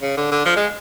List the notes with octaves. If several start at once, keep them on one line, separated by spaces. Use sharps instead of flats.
C#3
D3
D3
F3
G#3